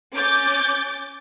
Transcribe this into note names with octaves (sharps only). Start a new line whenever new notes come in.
C#4 D6 G6 A6